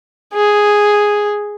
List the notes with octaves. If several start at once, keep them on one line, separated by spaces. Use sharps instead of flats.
G#4